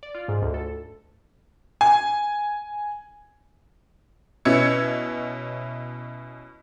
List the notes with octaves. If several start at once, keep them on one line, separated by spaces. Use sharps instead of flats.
D5
F4
G#2
D2
A4
G#5
B2 C#4 E4 E6 G#6 C#7